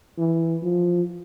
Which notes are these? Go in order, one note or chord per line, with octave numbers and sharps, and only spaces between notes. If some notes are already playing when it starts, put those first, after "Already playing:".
E3
F3